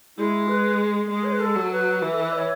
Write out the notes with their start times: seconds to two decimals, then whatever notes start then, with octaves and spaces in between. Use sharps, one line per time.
0.18 G#3 E4
0.48 B4
1.10 G#3 G#4
1.24 C#5
1.32 B4
1.40 A4
1.55 F#3
1.72 B4
2.02 E3
2.13 A4
2.23 B4
2.33 E5
2.37 C#5